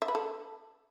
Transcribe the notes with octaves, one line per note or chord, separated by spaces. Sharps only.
E5
B4
A4